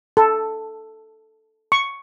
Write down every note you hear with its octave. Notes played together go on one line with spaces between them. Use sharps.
A4
C#6